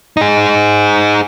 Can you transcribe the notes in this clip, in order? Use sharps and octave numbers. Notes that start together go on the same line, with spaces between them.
D#4 G#4